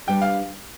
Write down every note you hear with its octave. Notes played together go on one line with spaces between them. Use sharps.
G3 D4 G4 B4 D5 G5
F5